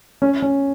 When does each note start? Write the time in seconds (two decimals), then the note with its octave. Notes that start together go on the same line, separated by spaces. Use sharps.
0.22 C#4
0.42 C#4